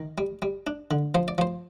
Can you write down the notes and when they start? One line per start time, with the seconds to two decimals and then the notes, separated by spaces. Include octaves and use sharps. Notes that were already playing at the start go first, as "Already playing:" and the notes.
Already playing: D#3
0.18 G3
0.42 G3
0.67 D4
0.91 D3
1.15 F3 C5
1.28 D5
1.38 F3 C5